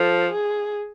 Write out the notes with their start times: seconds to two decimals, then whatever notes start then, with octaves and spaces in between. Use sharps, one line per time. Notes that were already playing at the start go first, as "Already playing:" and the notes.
Already playing: F3 A4
0.32 G#4